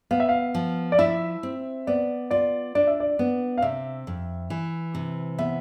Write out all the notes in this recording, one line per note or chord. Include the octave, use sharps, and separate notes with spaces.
B3 F5
E5
F5
F3
D5
E4 E5
C4
B3 D5
F4 D5
D4 D5
E5
D5
B3
F5
C3 E5
F2
E3
C3
B3 E5